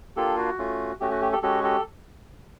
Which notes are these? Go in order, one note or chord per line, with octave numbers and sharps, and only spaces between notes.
A#3 D4 F4 G4 A4
F#4
A3 C#4 F4
A3 C#4 F#4 G4
F#4
G4
G4 A4
G#3 C#4 F#4 G4 A4
G4 A4